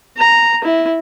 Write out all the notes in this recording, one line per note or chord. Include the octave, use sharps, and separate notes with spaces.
A#5
E4